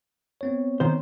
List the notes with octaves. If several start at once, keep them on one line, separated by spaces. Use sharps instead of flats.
B3 C4 C#5
D#3 C5